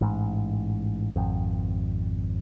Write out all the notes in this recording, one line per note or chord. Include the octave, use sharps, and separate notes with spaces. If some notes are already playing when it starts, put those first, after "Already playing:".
A1 G#2
G#1 F2